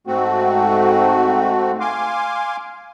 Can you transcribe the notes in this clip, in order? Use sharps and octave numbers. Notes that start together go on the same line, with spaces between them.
G#2 A3 C4 F#4
F5 G#5 C6 D6